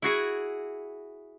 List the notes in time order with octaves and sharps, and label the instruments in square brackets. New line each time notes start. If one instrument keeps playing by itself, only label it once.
[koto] E4 F#4 G#4